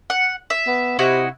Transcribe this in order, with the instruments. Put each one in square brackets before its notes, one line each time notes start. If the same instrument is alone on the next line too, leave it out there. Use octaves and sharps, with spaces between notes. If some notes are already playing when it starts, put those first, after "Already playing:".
[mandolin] F#5
E5
[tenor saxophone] B3
[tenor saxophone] C3 [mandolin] E4 F#4 D#5